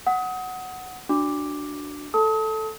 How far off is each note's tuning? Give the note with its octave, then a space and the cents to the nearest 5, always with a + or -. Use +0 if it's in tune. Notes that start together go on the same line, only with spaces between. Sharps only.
F#5 +0 D#6 +30
D4 +0 F#4 +5 D6 +0
A4 +0 A5 +0 D#6 +40